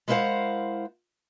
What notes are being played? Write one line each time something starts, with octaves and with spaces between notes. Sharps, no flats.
G#3 E4 A#4 C5 F5 F#5